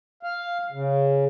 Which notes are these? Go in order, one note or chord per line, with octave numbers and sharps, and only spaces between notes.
F5
C#3